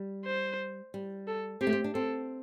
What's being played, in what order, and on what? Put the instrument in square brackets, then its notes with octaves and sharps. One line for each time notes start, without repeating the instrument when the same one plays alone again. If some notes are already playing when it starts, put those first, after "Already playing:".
Already playing: [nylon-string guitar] G3
[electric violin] C5
[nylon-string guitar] G3
[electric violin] A4
[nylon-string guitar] C4 [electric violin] G4
[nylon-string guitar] A3
C4
D4
[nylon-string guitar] C4 [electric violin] A4